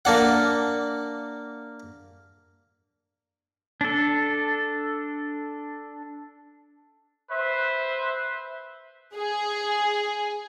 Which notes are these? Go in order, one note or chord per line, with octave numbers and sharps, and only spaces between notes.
A#3 D4 F#5
D4 A4
B4 C5 E5
G#4